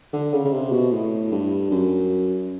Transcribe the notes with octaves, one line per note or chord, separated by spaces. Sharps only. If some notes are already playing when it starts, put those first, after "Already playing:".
D3
C#3
C#3
C3
B2
A2
G2
F#2